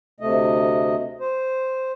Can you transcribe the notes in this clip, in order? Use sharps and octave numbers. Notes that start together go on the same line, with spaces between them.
D2 C3 A3 D#5
C5